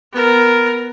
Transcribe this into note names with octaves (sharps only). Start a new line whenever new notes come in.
B3 A#4